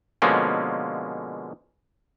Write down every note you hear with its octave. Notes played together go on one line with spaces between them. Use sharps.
B2 D3 F3 G#3 A#3 C#4